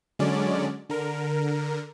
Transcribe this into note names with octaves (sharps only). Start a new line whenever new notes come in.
D3 F#3 G#3 C#4 D5
D3 A#4